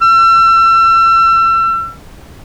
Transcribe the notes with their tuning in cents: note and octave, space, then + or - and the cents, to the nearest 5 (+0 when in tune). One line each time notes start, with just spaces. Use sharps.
E6 +35